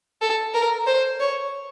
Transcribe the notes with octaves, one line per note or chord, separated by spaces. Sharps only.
A4
A#4
C5
C#5